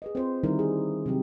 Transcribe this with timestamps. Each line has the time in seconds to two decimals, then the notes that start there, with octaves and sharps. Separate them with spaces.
0.02 G#4 B4 D#5
0.15 C4 F4 C5
0.43 D3 D#3 G3 D#4 E4 A#4
0.59 G#4
1.06 C3 F#3 C4 G4